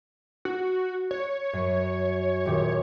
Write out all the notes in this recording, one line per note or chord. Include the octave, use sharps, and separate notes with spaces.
F#4
C#5
F#2
D#1 G4